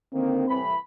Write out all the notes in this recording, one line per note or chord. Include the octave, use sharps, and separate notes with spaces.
D3 D#3 A#3 C4
C2 A2 E3 B5